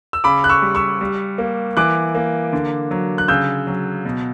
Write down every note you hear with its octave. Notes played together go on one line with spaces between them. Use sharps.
E6
C#3 B5 D6
F#6
C#6 E6
G3
C#6 E6
G3
A#3
E3 D6 F#6
A#3
D3
F#3
F#6
C#3 E6 G6
F#3
B2